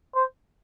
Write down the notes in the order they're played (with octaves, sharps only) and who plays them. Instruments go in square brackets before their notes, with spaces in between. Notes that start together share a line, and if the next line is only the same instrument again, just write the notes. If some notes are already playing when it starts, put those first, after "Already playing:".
[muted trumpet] C5